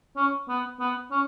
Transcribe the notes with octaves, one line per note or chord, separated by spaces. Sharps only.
C#4
B3
B3
C#4